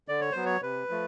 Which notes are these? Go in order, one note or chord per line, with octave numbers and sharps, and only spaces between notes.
D3 D5
C#5
F#3 B3 C5
C#5
C3 B4
F3 A3